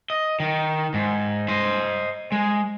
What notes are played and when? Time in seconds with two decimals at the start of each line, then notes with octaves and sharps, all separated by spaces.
0.10 D#5
0.40 D#3
0.94 G#2
1.48 C5 D#5
2.32 G#3